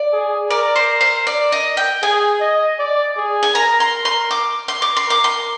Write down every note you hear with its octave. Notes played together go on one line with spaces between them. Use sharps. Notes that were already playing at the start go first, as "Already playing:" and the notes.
Already playing: D5
G#4
A#4 D5
C5
C5
D5
D#5
G5
G#4 G#5
D#5
D5
G#4
G#5
A#4 A#5
C6
C6
D6
C6
D6
C6
A#4 D6
C6